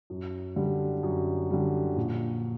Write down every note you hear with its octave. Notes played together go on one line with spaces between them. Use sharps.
F#2
D3 G3
F#2
D3 G3
A#1